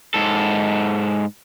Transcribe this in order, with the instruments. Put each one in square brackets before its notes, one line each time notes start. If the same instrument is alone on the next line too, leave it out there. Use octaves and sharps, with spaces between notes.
[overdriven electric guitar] G#2 A4